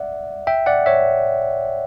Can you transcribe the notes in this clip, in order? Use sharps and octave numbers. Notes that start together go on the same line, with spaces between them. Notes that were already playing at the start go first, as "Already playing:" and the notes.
Already playing: D5 E5 F#5
E5 G5
D5 F#5
C#5 E5